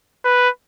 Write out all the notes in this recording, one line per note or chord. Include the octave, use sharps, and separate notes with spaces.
B4